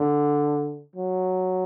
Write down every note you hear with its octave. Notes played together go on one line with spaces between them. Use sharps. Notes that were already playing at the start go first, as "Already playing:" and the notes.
Already playing: D3
F#3